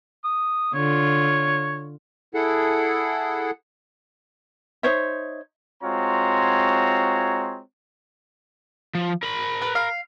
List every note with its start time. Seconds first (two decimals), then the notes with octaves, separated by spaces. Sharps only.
0.24 D#6
0.74 D3 F4 C#5
2.34 E4 G#4 A4 F#5
4.83 D#4 C5 C#5 E5
5.83 G#3 C4 F4 F#4 C#5 A#5
8.95 F3
9.23 A#4 B5
9.62 B4
9.75 F5